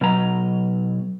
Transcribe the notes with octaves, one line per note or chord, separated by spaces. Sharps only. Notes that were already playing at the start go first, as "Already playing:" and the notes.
B2 F#3 A#5